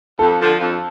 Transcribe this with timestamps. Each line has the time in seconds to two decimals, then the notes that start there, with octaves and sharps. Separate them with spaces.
0.19 F2 A4
0.39 D3 F3
0.59 F2